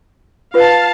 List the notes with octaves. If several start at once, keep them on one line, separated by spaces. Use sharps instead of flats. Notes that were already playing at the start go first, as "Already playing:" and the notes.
F4 B4 F5 F#5 A5